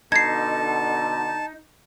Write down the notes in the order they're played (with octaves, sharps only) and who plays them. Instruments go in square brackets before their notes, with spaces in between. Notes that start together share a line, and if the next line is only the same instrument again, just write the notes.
[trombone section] B2 D3 [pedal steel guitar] D#4 [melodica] A5 [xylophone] G#6 C7